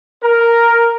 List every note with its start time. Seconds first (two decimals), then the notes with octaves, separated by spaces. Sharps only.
0.23 A#4